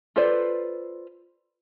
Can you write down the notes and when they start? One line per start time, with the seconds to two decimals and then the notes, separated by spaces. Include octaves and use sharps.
0.16 F4 A4 B4 C5 D5